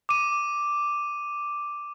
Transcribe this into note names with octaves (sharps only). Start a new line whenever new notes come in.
D6 D#7